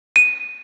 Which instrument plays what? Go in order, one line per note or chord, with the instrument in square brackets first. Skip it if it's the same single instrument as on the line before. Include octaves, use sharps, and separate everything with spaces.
[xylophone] D#7